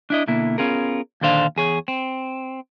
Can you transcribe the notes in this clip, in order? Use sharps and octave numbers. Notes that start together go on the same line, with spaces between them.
D4 E4 D#5
B2 D3 A#3 E4
B3 C#4 F4 G#4 A#4
D#2 A#2 D3 D4 C5 F5
E2 G#4 C#5
C4